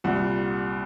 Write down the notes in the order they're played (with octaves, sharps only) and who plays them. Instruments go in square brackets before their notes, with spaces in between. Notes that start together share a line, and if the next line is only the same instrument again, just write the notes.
[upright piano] C2 A#2 G3 F#5